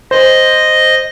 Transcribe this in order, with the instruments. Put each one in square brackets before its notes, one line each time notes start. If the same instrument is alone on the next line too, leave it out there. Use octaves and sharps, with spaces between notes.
[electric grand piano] C5 [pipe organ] D#5